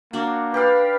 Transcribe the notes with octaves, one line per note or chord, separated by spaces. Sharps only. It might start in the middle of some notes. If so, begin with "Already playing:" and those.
A#3 D4 F#4
G4 B4 D5 F5